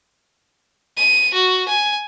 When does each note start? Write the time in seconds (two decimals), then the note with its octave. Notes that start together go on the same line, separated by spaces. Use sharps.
0.97 D#7
1.34 F#4
1.68 G#5